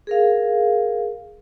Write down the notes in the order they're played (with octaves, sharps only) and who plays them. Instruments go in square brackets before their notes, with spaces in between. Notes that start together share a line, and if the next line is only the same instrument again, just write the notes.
[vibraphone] G#4 A#4 F5